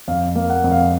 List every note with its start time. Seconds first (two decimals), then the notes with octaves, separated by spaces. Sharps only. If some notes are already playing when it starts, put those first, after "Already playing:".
0.08 F2 F5
0.35 A#3
0.50 F#5
0.64 F2
0.72 F5